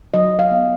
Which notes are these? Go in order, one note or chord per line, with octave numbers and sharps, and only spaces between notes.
F#3 D#5
F5
B3